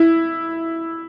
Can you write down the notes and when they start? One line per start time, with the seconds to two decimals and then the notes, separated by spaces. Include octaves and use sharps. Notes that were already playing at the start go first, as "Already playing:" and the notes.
Already playing: E4